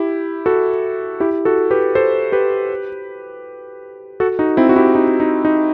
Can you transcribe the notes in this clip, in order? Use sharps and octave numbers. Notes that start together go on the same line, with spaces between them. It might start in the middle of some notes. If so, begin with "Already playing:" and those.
Already playing: E4 G4
F#4 A4
E4 G4
F#4 A4
G4 B4
A4 C5
G4 B4
F#4 A4
D#4 F#4
C4 E4
F#4
E4 G4
D#4 F#4
D#4
D#4